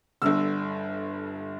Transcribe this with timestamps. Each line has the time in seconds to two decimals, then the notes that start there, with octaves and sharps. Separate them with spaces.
0.22 G1 G2 D3 E6